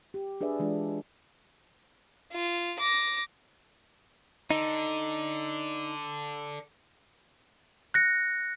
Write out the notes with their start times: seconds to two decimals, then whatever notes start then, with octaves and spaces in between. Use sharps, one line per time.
0.14 G4
0.41 D4 G#4 B4 D5 E5
0.59 E3 G#3 D4 F4
2.32 F4
2.79 D6 A#6
4.51 D3 D#4
7.94 F#6 A#6 C#7